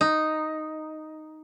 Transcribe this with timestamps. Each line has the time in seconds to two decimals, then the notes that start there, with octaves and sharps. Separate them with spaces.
0.01 D#4